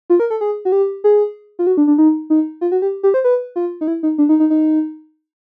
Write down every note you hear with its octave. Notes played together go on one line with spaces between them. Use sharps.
F4
A#4
A4
G#4
F#4
G4
G#4
F4
F#4
D4
D4
D#4
D#4
F4
F#4
G4
G4
C5
B4
F4
D#4
E4
D#4
D4
D#4
D#4
D#4